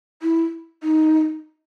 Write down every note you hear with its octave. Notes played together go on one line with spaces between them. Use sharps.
E4
D#4